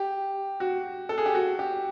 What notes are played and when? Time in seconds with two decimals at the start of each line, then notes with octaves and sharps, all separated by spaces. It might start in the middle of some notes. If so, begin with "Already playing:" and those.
Already playing: G4
0.60 F#4
1.09 A4
1.18 G#4
1.26 G4
1.35 F#4
1.59 G4